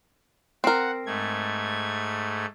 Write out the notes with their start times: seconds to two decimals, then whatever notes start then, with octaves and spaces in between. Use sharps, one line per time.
0.64 C4 A#4 F#5
1.06 G#2 A3 G#6